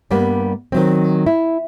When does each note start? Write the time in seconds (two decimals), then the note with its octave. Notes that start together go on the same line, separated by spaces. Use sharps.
0.11 G2 G3 A#3 B3
0.72 D#3 F#3 C4
1.26 E4